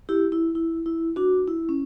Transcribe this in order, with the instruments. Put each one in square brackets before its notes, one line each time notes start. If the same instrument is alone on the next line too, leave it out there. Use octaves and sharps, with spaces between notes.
[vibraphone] E4 G4
E4
E4
E4
D4 F#4
E4
C#4